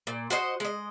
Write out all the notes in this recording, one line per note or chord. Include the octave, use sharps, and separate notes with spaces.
A#2
F#4 C5 D#5
G#3 D#5